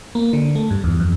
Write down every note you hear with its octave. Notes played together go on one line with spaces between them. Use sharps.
A#3
D3
A3
G2
E2
F2